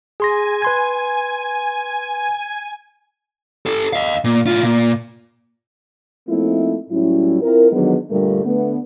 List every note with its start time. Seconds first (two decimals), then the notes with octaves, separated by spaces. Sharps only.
0.20 G#4 G#5 C6 A#6
0.62 B4 C6 G#6
3.66 G4 A4
3.93 D#5 F5
4.24 A#2
4.47 A2 F4
4.63 A#2
6.29 F3 A3 A#3 C4 D#4 E4
6.90 A2 F#3 G3 C#4 E4
7.42 C4 E4 F4 A#4
7.71 D3 D#3 F3 F#3 G#3 B3
8.10 G2 A#2 D3 G3 A3 A#4
8.44 D3 A3 B3